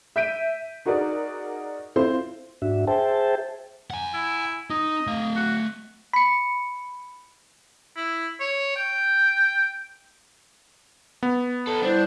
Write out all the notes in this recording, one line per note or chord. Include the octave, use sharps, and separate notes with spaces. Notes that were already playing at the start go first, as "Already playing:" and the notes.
E5 G6 B6 D7 D#7
D#4 F#4 G#4 A#4 D5
C4 E4 F4 C5
G#2 D4 F#4 E5
G#4 C5 E5 G5 A5
F#5 G#5
E4
D#4 D#5
A3 F5
F#4
B5 C#7
E4
C#5
G5
B3
A4 B4
G3 D4 E4 C5